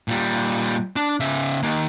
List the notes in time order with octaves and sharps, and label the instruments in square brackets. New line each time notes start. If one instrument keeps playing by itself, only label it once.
[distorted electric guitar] A#2 G3
D4
C#3 E5
D#3 A#3